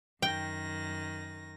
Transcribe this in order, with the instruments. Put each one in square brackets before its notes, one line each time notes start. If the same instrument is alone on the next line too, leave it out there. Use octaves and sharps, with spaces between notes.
[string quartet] F#2 D#3 A#6 [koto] G5